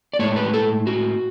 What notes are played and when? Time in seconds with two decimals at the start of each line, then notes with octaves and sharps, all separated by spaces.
0.14 D5
0.19 A2 G#3 C#5
0.36 B4
0.54 A4
0.87 F#4